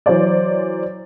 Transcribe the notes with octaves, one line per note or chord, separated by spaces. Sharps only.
E3 F#3 C5 D5